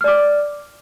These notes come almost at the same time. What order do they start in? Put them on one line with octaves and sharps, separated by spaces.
F6 D5 D6